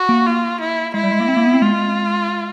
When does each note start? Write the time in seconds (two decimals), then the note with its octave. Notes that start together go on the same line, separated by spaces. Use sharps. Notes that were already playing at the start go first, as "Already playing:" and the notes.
Already playing: F#4
0.09 A#3
0.26 F4
0.61 E4
0.94 G#3 E4
1.03 G3
1.11 G#3
1.20 A#3
1.28 C4
1.37 A#3
1.46 B3
1.54 C4
1.62 G#3 F4